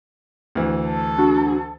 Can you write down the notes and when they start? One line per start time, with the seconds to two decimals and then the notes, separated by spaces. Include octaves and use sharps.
0.55 D2 E3
0.86 A4
1.18 D4 F#4